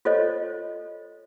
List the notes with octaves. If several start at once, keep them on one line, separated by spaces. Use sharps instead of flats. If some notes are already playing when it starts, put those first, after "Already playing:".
F4 A4 C5 C#5 D#5